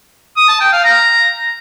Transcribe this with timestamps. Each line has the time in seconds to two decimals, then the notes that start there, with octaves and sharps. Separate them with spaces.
0.37 D#6
0.49 A5
0.60 G5
0.72 F5
0.84 A#5